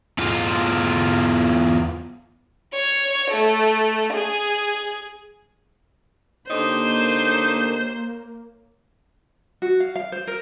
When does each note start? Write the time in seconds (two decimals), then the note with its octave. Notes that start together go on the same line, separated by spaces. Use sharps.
0.18 E2 F4
2.72 C#5
3.31 A3
4.14 G#4
6.50 D3 A#3 D#4 G4 C5 C#5
9.62 F#4
9.80 F5
9.96 F5
10.12 C5
10.27 A#4